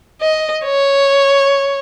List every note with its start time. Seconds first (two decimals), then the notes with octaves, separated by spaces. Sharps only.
0.21 D#5
0.65 C#5